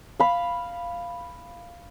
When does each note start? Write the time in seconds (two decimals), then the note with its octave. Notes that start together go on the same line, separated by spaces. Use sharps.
0.20 F5 B5